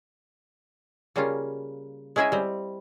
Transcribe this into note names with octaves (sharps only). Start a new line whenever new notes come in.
C#3 G3 A#3 C#4 F4
G#3 C#4 E4 G#4 D#5 E5
G3 C4